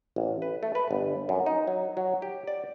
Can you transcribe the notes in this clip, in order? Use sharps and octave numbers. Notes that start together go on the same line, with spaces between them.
A1
B4
A3
B4
G1
F#2
D#4
F#3
F#3
G4
D5